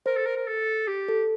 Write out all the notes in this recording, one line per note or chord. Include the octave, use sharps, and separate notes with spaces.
A#4 C5
A4
A#4
A#4
A4
G4
A4